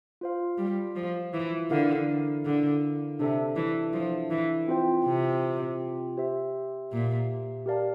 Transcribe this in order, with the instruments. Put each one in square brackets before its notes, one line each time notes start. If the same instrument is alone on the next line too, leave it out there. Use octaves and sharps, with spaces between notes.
[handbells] F4 C5 F5
[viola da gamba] G3
F3
E3
[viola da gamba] D3 [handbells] E4 A#4 F5
[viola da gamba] D3
[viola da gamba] C3 [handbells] D4 A4 E5
[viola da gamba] E3
F3
E3
[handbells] C4 F4 C5 G5
[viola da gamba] C3
[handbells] G4 C5 E5
[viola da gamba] A#2
[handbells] G4 A#4 D5 F5 A5